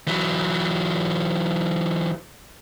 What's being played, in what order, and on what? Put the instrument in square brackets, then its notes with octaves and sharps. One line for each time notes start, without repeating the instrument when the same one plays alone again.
[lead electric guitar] E3 F#3